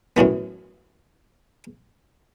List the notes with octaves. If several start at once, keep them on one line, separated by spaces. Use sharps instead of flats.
F#2 A2 E3 B3